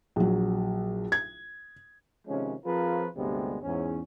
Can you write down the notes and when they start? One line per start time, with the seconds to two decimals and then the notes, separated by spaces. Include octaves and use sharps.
0.16 A#1 F#3
1.12 G#6
2.28 C3 D#3 F3 G#3 C#4
2.65 F3 C4 F4 G#4 A#4 B4
3.16 D2 G2 C3 G3 G#3 B3
3.63 E2 G#2 C#4